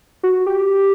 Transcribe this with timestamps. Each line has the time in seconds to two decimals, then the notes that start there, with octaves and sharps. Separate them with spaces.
0.23 F#4
0.46 G4